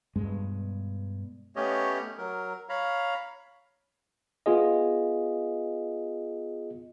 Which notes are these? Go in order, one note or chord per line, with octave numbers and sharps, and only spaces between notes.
G2 B2 G#3
A3 B3 C#4 G4 C#5 D#5
F#3 A#4
C#5 F5 A#5 B5
B3 F4 G#4 D#5